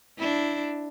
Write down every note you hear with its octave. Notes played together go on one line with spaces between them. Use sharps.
D4 E4